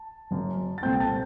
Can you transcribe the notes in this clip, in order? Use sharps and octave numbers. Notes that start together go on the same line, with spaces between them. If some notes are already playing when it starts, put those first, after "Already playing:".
Already playing: A5
F#1 F#2 F#3
A6
C2 A#2 A3 C4 G5 G6
A5 A6